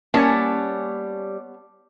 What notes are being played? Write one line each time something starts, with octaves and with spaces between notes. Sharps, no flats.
G3 A#3 B3 C#4 C#5 G#5 A5